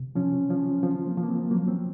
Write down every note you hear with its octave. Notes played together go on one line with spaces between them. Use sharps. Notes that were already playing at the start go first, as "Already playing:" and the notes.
Already playing: C3
F3 C#4
F3 C#4
F3 C4
A#3
F3
A#3
C4
F#3 A#3
C4